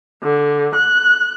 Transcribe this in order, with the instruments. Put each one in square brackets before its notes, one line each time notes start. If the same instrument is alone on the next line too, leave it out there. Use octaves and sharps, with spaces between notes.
[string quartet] D3
F#6